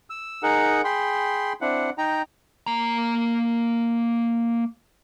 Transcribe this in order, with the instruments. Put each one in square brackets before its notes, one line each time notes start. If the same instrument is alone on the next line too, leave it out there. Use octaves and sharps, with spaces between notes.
[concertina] E6
D#4 G#4 A#4 F#5
G#4 G5 B5 C6
C4 D4 E4 F#5
D#4 G5 A#5
[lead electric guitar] A#3 A#5